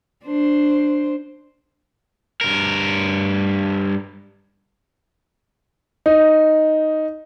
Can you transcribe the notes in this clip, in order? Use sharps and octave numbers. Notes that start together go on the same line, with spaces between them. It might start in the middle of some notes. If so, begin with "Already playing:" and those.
D4 C5
G2 A#4
D#4